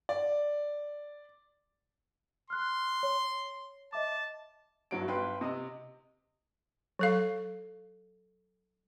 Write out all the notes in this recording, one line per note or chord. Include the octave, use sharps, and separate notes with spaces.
D5
C6 F6 F#6
C#5
D#5 E5 A5 D6
G1 G2 F#3 E4 D7
G1 B4 G5 C6
C3 D#5 D#6
F#3 A4 F5